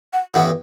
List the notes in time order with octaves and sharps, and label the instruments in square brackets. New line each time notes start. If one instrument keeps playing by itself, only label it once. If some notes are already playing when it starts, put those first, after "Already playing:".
[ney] F#5
[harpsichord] A1 G2 E3 B3 [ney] F#5